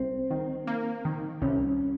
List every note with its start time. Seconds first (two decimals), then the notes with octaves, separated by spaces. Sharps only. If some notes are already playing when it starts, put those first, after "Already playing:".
Already playing: C2 C4
0.31 D#3
0.67 A#3
1.05 D#3
1.42 C2 C#4